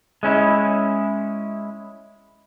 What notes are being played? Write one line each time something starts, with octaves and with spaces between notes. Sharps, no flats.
G#3 C#4 E4